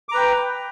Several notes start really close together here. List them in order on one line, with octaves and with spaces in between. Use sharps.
D6 A#5 B4 G5